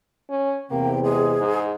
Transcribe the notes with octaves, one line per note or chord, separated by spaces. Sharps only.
C#4
E2 C3 A#3 G5
G#3 G#4
G#2